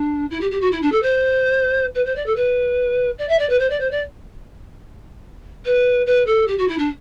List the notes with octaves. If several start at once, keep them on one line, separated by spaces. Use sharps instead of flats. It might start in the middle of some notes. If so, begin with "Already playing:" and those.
Already playing: D4
E4
G4
G4
F#4
E4
D4
A4
C5
B4
C5
D5
A4
B4
D5
E5
D5
B4
C5
D5
C5
D5
B4
B4
A4
G4
F#4
E4
D4